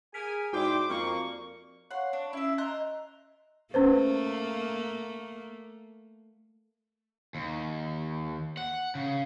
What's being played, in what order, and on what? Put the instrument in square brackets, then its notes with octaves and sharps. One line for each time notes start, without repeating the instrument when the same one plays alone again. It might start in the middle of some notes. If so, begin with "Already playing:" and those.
[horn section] G#4 A#4 G#5 [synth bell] B6
[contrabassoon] G#2 [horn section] E4 C5 G5 [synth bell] F#4 D5 [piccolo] D6
[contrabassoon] F2 [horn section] A#3 [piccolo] C#6
[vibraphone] C#5 F5 C#6 [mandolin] F#5 C6
[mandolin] D4
[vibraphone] C#4 [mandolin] E4 E5
[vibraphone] D#5 [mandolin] A#5 C6 F#6
[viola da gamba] A3 A#3 [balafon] C#4 B4 C5
[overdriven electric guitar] D#2
F#5
C#3